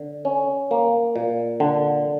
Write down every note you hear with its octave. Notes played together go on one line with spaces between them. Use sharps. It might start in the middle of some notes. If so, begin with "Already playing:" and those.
Already playing: D3
C#4
A#3
A#2
D3